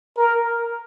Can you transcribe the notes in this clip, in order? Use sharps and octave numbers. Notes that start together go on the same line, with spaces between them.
A#4